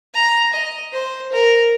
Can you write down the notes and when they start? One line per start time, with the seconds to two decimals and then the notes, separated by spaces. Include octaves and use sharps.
0.15 A#5
0.54 D#5
0.93 C5
1.32 A#4